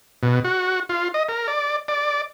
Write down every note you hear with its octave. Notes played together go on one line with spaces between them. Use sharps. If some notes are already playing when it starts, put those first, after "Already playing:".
B2
F#4
F4
D#5
A#4
D5
D5